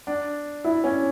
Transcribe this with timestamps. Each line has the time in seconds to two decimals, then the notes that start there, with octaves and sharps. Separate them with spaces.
0.07 D4
0.64 E4
0.84 C#4